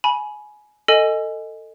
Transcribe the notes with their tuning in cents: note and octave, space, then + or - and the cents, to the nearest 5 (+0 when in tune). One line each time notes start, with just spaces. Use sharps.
G#5 +20 B5 -20
A4 +25 D#5 +0 G#5 +0